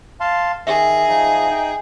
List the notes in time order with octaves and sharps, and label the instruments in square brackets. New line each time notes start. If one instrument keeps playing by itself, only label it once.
[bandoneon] F5 A5 C6
[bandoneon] D#3 [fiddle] G#4 [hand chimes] E5
[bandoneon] F3 D#4
D#4 G5